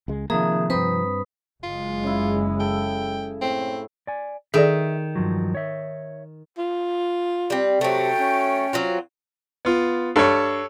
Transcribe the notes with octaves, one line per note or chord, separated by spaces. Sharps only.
C#2 G#3
C3 D#3 F3 A#3 G#4 E5 A#5 D#6
G2 C4 B4 B5 D#6
F#1 G#3 F4
C#3 E4
A4 G5
A2 C4
D5 G#5
D#3 G#4 A4 D5 E5
G2 F3 F#3
C#5 E5
F4
G3 C4
C3 F#3 A3 G5
C#4
F#3 C4 F4
B3 F4
G2 A4 C#5